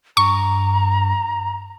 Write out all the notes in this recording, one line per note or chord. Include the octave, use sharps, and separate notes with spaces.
G2 A#5 C#6